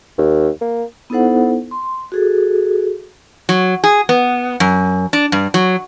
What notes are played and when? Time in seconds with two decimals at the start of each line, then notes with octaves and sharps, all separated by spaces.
0.18 D#2
0.61 A#3
1.10 B3 D#4 E4 A4 C5 F#5
1.71 C6
2.12 F#4 G#4 A4
3.49 F#3
3.84 G#4
4.09 B3
4.60 F#2
5.13 D4
5.32 G2
5.54 F#3